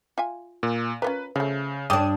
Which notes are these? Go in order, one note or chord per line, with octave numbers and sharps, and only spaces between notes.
F4 E5 G#5
A#2
C#4 F4 A#4 B4
C#3 F3 A3
G2 G3 D4 G4 A4 D#6